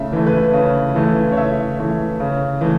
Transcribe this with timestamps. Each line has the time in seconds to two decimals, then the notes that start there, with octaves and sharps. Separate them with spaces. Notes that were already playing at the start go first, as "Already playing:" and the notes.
Already playing: C#3 A3 E5
0.13 E3 A3
0.27 B4
0.53 C#3
0.95 E3 A3
1.32 C#5
1.36 C#3 E5
1.79 E3 A3
2.20 C#3
2.61 E3 A3